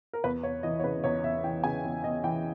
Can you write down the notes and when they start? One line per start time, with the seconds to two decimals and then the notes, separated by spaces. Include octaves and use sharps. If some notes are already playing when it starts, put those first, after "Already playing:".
0.13 A#4
0.24 E2 B4
0.43 E2 C#5
0.63 E3 D#5
0.79 C#5
0.84 C#3 B4
1.04 E2 C#5
1.23 E2 E5
1.44 E3 G5
1.64 C#3 G#5
1.84 E2
2.04 E2 D#5
2.24 E3 G5